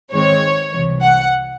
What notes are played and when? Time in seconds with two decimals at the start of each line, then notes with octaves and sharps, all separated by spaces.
0.12 G#2 D#3 G#3 C4 C#5
0.71 C2 C3 E3
1.02 F#5